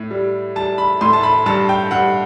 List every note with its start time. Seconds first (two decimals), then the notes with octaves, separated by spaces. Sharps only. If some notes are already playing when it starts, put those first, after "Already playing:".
Already playing: A2
0.11 G3
0.56 G3 A5
0.78 B5
1.01 A2 C6
1.13 A5
1.23 B5
1.46 G2 A5
1.69 G5
1.91 G2 F#5